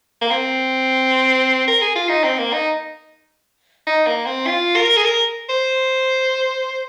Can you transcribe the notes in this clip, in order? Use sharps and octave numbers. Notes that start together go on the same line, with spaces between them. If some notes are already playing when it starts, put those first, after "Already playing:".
A#3
C4
A#4
G#4
F4
D#4
C4
A#3
D#4
D#4
A#3
C4
F4
A#4
G#4
A#4
C5